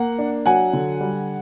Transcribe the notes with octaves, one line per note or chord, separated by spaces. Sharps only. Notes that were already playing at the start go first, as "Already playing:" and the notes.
Already playing: A#3 F#5
D4
F#3 F#5 G#5
D3
G3